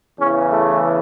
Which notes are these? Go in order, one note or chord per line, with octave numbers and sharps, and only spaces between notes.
E2 C#3 E3 C#4
A3